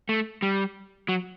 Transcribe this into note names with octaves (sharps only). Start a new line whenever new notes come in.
A3
G3
F#3